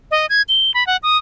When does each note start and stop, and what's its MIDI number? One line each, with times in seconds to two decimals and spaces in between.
0.11 0.26 75
0.29 0.42 92
0.48 0.71 103
0.74 0.86 83
0.87 0.97 78
1.03 1.17 87